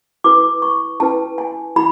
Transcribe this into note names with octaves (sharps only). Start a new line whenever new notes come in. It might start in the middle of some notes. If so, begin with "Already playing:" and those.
E4 B4 D6
C#6
C#4 E4 B4 A5
G#5
E4 B5